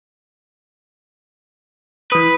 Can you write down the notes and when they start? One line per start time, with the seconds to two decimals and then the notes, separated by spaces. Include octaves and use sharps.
2.12 E3 B4 D#6